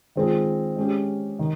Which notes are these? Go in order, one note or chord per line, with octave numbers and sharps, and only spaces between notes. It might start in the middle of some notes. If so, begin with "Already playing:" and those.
D#3 G#3 C4 F4 G#4
G#3 C#4 G4
D#3